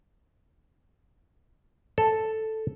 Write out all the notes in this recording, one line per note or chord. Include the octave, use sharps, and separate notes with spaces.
A4